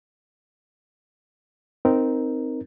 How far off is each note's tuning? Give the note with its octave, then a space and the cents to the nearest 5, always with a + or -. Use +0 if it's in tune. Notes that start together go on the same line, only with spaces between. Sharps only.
C4 -5 D#4 +0 A#4 +5